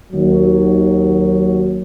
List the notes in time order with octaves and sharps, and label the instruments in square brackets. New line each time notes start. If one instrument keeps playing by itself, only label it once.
[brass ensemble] D#2 F#3